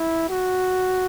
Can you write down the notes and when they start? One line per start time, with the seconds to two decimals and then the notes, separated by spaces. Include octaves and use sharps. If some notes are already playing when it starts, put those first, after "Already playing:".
Already playing: E4
0.29 F#4